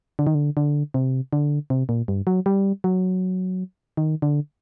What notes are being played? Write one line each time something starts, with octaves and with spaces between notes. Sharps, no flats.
D3
D#3
D3
D3
C3
D3
C3
A#2
G2
F#3
G3
F#3
D#3
D3